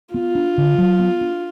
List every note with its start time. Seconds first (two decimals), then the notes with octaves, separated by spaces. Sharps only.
0.14 B3 F4
0.35 D4
0.58 D3
0.78 F#3
0.99 B3
1.21 D4